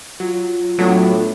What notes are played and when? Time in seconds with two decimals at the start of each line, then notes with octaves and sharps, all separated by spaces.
0.20 F#3 F4
0.79 A2 F#3 A3 B3 D4